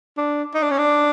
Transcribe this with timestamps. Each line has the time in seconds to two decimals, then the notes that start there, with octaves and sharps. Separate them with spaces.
0.17 D4
0.55 D#4
0.63 D4
0.71 C#4
0.78 D4